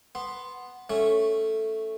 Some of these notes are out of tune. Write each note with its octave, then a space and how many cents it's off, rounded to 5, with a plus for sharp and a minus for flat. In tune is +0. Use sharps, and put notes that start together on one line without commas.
B3 +0 C6 +0
A3 +0 C#4 +0